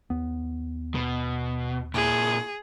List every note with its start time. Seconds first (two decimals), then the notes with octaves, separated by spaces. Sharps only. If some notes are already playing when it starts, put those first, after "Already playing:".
0.10 D#2 B3
0.95 B2
1.94 A#2 E4 G#4